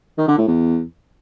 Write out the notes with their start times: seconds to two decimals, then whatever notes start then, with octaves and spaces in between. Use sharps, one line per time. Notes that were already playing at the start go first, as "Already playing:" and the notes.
0.18 D#3
0.28 D3
0.38 A2
0.48 E2